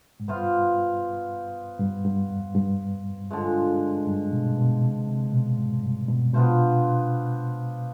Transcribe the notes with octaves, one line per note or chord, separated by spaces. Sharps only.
G#2
G2 B3 F4 C5 F5
G2
G2
F2
G2
D3 F3 G#3
G2
B2
B2
C3
C3
B2
G#2
G2
B2
B2 B3 D4 F4 C5